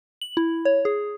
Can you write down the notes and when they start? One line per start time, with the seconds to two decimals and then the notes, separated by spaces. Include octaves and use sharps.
0.21 F#7
0.37 E4
0.65 C#5
0.85 G#4